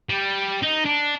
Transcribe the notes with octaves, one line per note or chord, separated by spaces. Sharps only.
G3
D#4
D4